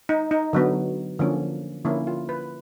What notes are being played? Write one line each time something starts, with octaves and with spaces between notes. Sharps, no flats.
D#4
D#4
D3 F#3 B3
D3 F3 A#3 C#4
D3 F3 A#3 C#4 E4
F4
B4